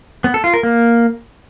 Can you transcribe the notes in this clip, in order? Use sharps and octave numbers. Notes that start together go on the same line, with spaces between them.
B3
A4
F4
A#4
A#3